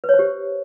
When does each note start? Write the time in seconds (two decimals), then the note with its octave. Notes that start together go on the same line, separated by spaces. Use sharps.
0.04 B4
0.09 C#5
0.14 C5
0.19 G4